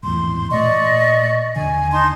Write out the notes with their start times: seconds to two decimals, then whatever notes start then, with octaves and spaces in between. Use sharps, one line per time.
0.03 G#1 E2 A2 C6
0.51 A#2 A3 D5 D#5 C#6
1.56 D#2 D3 G#5
1.92 D#4 A5 C6